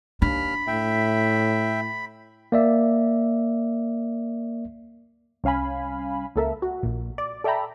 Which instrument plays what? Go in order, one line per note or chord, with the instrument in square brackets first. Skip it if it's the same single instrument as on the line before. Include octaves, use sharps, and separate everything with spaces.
[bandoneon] D#2 F6 [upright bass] D4 [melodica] B5
[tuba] A2 [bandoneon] E5 G5
[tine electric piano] A#3 D5 E5
[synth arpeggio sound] C2 C#4 F5 G#5 B5
C#2 A#3 A4 A#4 E5
F#4
A#1 A#2
D5
A4 D5 E5 G5 A#5 B5